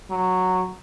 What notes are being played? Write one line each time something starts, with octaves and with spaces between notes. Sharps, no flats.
F#3